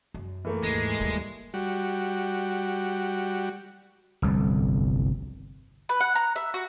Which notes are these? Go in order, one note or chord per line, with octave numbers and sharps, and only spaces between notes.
F#2
E3 A3 A#3
D#2 G#2 G#3
D#2 G3
G3 F#4
G1 C2 F2
B4
F#5
A#5
E5
F#4